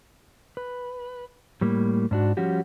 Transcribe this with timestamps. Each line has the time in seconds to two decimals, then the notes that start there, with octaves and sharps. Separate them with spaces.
0.57 B4
1.61 A2 G3 A#3
2.11 G#2 D4 F#4
2.37 F3 G3 C#4 F#4 G4